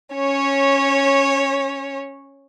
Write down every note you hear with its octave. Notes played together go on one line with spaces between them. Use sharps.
C#4 C#5